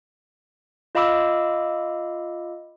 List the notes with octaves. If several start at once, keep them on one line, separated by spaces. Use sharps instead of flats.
F4 D#5 F5 B5 D6 E6